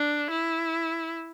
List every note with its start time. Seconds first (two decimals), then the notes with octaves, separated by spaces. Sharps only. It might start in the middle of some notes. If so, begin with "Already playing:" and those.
Already playing: D4
0.30 E4